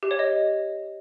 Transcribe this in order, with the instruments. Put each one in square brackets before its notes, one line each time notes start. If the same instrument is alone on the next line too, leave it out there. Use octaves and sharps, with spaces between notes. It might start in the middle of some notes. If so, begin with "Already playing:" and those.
[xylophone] G4
C#5
D#5